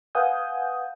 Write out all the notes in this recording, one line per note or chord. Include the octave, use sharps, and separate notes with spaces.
B4 F5 F#5 G#5 D#6 G6